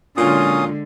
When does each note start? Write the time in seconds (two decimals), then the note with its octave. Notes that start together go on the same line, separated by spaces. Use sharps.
0.17 A#2 D3 F#3 G#3 C#4 F4 D#6